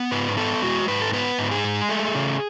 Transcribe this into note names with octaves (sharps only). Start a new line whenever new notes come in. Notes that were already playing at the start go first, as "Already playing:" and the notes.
Already playing: B3
G#2 B4
B3 A4
G#3 F#4
G#2 B4
A4
B3 B4
G#2
G#4
G#3
A3
C#3